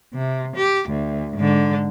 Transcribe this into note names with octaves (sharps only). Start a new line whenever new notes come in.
C3
G4
D2
G#2 D3